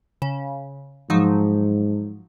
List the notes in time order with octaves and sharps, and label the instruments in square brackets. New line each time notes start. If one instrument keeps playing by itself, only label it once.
[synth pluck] C#3
[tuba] G#2 [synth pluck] F3 F#3 D#4